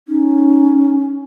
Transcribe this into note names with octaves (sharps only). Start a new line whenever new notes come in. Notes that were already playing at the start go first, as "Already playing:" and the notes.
C#4 D#4